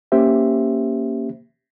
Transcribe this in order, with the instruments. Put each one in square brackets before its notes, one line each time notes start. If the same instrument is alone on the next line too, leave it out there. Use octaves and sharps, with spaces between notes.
[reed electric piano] A#3 C#4 G4 C5 E5